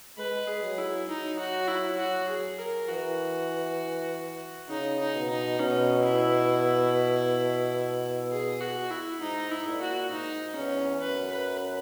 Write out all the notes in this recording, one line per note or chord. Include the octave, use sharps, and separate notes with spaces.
G#3 B4
G#4
F#3
E4
F#3 D#4
F#4
E4
F#4
G#4
A#4
E3 F#4
C#3 D#4
D#4
B2
D#4
B2 C#4
E4
G#4
F#4
E4
G#2 D#4
E4
A#2
F#4
G#2 D#4
E2 C#4
F#2 B4
B4